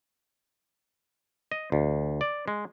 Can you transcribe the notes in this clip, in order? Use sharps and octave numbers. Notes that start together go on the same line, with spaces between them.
D#5
D2
D5
G#3